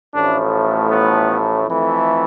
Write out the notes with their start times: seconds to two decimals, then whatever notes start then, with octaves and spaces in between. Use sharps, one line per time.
0.14 A1 A2 F3 A3 D4
0.90 B3
1.67 F2 E3 A3